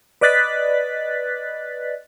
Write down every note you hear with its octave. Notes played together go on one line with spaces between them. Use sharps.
B4 D5 D#5 F#6 A6 B6